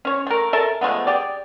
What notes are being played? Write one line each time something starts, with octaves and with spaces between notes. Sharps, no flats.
C#4 C#5
A3 A#4
A4 A#4 E5 A5
F3 G#3 A3 B3
G4 G#4 D5